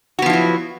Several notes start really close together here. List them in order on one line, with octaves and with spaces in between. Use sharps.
F#4 B3 F3 E4 F#3